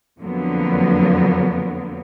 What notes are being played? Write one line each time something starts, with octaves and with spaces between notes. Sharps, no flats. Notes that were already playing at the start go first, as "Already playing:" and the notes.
F2 D3 F#3 A#3 B3